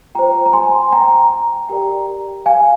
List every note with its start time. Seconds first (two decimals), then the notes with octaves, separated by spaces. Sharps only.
0.15 F4 C5 G5 A#5
0.46 A#5
0.53 G#5 C6
0.92 G5 A#5
1.69 G4 A#4 D5 G5 A#5
2.46 F5 G#5